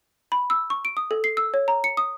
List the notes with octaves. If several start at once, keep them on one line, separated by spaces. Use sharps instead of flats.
B5
E6
C#6
D7
D#6
A4
C7
E6
C#5
A#5
C#7
D#6